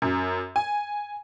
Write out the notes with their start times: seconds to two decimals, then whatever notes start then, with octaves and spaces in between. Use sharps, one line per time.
0.02 F#2
0.56 G#5